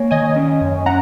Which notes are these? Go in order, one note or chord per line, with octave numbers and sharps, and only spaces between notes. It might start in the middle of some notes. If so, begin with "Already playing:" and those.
Already playing: A#3 C#5 G#5
D#3 D#5 G#5
C#4
F#2
C#4 F#5 A#5